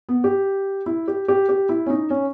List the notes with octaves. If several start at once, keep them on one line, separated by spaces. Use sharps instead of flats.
B3
G4
E4
G4
G4
G4
E4
C#4
D#4
C#4